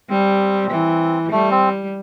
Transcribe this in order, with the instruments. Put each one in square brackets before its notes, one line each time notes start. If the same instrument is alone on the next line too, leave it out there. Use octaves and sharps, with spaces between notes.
[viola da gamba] G3 [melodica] C4
[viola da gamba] E3
[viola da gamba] G3 [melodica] A3
[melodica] C4